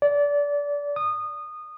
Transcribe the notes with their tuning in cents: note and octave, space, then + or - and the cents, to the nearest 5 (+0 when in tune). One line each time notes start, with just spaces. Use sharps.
D5 -25
D#6 -20